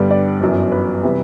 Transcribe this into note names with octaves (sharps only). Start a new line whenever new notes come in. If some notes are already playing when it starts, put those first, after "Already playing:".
Already playing: G2 D3 G3 B3 D4
D5
G1 F#2 E3
B4
C3 E3 G3